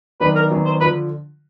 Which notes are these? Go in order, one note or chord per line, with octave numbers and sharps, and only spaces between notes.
F#2 D#3 F#3 B3 D4 B4
A#4
F#2 D#3 F#3 B3 D4
C5
D3 F3 B4